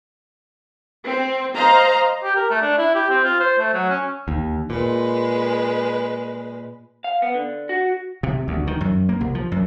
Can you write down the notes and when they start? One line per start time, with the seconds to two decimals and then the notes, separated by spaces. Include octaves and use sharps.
1.05 C4
1.55 C5 D#5 F5 A#5
2.24 G4
2.36 A#4
2.50 A3
2.62 D4
2.78 E4
2.95 G4
3.10 C4
3.24 F4
3.40 C5
3.59 A3
3.74 F#3
3.90 C#4
4.28 D#2
4.70 A#2 G#3 B4
7.04 F5
7.22 B3
7.34 D3
7.69 F#4
8.23 C3
8.48 D2
8.67 D#3
8.81 F#2
9.09 A#3
9.21 C2
9.35 F3
9.52 F#2